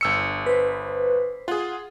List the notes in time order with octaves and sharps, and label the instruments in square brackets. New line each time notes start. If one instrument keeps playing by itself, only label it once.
[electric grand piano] G1 E6 C#7
[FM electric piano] B4 C5
[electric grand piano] F4 G#4 [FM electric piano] F#5